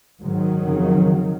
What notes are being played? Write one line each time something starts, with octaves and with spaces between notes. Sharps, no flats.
G#2 D#3 F#3
F2 C#3